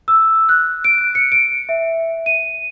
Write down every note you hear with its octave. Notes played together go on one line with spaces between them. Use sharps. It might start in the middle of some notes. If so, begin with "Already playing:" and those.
E6
F#6
D7
C#7
D7
E5
D#7